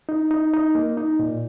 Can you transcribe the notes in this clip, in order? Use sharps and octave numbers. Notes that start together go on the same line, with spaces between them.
D#4
D#4
D#4
A#3
D#4
A#2